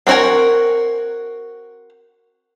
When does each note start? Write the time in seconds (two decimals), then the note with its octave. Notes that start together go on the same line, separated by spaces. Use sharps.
0.07 C4 D4 F#4 A#4 G#5